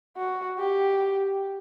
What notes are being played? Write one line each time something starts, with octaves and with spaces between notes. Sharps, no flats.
F#4
G4